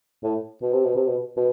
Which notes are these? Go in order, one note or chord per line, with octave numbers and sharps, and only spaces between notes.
A2
B2
C3
B2
C3
B2
B2